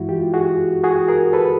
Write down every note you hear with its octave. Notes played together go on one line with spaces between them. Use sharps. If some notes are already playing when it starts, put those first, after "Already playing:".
Already playing: G2 E3 G#3 E4 F#4
F4 G4
F#4 G#4
F#4 G#4
G#4 A#4
A4 B4